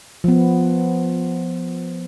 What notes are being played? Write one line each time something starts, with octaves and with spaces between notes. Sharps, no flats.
F3 B3